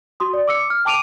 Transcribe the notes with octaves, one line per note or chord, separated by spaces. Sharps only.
F#4 C6 D#6
D5
D6 E6 C#7
F6
G5 A5 D6 D7 D#7 F7